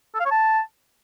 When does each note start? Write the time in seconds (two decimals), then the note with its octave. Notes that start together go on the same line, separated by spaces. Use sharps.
0.14 A4
0.20 F5
0.26 C#5
0.31 A5